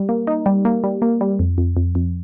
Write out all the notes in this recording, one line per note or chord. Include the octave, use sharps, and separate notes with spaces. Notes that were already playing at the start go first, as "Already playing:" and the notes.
Already playing: G3
A#3
D#4
G3
A#3
G3
A#3
G3
F2
F2
F2
F2